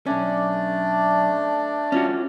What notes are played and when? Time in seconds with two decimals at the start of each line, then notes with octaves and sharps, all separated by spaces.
0.06 B1 A3 C#4 D4 D5
1.92 C#4 F4 F#4